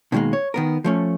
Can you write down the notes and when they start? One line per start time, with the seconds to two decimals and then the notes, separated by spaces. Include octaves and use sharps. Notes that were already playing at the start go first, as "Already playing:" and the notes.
0.12 B2 D#3 F#3 G#3 A#3
0.33 C#5
0.54 D#3 B3 A#4
0.84 F3 A3 C#4